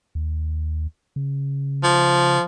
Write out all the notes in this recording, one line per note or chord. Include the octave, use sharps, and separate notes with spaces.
D#2
C#3
F3